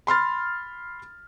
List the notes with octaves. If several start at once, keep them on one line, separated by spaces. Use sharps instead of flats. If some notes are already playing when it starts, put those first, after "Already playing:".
B5 C6 F6 A6